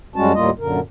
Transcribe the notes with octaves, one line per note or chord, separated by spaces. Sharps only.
F#2 G3 G#3 C#4 F#4 A5
D#2 A2 G3 A#3 F4 D#5
F#2 A#2 D3 A#4